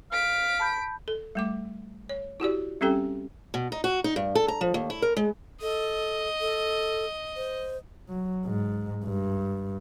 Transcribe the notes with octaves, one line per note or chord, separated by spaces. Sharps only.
F5 B6 D7
A5 B5 G6
A4
G3 A3 D6
C#5
E4 F#4 G4 D5
G3 C4 C#4 G4 A4 G5
B2
D#4
F#4
D#4
G2
A4
A#5
F3
D#2
E4
A#4
G#3
A4 D#5
A4
C5
F#3
G#2
G2